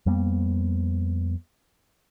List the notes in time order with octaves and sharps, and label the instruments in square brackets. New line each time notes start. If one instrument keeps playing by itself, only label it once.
[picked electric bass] F2 G3 A#3 B3